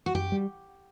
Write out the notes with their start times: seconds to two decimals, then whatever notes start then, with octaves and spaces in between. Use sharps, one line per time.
0.06 F#4
0.15 F#2 G4
0.32 G3